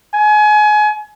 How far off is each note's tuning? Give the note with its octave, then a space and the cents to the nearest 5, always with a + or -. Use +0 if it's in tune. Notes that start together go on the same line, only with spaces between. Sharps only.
G#5 +30